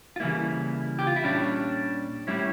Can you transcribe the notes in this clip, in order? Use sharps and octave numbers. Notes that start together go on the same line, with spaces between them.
F4
C#3 E3 G3 A#3 E4
G4
F4
E4
A#2 G3 C#4 D4
A2 G3 C#4 E4